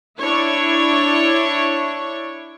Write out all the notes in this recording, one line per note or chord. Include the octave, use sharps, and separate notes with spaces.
D4 E4 C#5